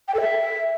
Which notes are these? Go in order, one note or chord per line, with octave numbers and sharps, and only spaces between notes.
G5
A4
E5